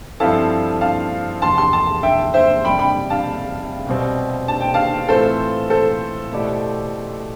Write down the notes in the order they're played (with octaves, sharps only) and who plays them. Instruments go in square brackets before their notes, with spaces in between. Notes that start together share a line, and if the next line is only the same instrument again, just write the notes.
[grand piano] G2 F3 C4 E4 A4 [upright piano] F5 A5
[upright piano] F5 A5
[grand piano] E2 C3 F3 [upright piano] A5 C6
[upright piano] A5 C6
A5 C6
E5 G5
C5 E5
[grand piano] F2 C3 G3 [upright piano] G5 B5
[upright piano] G5 B5
F5 A5
[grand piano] C2 B2 G3 C4
[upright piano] A5
G5
F5 A5
[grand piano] A2 E3 A3 C4 F4 [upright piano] A4 C5
[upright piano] A4 C5
[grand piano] B2 A3 E4 G4 D5